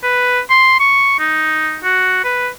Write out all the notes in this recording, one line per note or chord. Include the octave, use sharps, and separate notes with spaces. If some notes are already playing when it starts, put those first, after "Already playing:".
B4
C6
C#6
D#4
F#4
B4